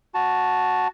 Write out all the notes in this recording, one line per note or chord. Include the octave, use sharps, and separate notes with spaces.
F#4 A5